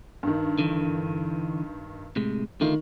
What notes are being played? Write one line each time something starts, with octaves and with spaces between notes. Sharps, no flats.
G2 D#3
D3 E3
A2 C3 G#3
D3 D#3 A3 F4